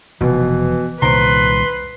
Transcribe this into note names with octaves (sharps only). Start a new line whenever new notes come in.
F1 B2 E3
C2 A#2 D#3 B4 C5 A#5 C6